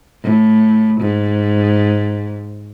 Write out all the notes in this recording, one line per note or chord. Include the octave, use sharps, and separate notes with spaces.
A2
G#2